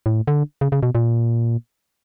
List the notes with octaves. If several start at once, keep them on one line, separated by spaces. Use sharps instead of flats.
A2
D3
C#3
C#3
B2
A#2